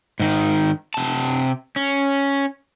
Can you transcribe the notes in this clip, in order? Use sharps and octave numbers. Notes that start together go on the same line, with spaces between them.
G#2 D#3
C3 A5
C#4